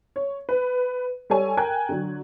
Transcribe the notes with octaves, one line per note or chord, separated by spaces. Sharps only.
C#5
B4
G3 A4 C#5 G#5
A#4 G5 G#5 F#6 G#6
D3 F#3